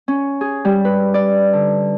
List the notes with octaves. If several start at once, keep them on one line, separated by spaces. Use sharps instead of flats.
C#4
G#4
G3
B4
D5
D3